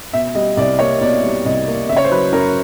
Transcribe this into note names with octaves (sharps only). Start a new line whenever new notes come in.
B2 E5
G3 D#5
C2 D5
A#3 C#5
B2 D5
G3
C2 D#5
A#3
C#3 E5
C#5
C5
F#3 B4
F#2 A#4